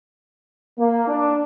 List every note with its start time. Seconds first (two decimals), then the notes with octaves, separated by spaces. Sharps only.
0.79 A#3
1.08 D4